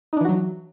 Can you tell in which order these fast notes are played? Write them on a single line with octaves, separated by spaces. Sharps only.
D#4 D4 E3 F#4 F#3